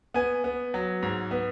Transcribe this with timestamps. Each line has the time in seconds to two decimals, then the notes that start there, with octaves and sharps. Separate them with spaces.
0.14 B3 G#5
0.44 B3
0.74 F#3
1.03 G#2
1.31 B3